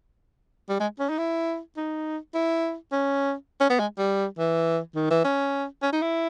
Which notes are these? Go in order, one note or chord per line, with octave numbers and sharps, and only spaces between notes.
G3
G#3
C#4
D#4
E4
D#4
E4
C#4
C#4
B3
G#3
G3
E3
D#3
E3
C#4
C#4
D#4
E4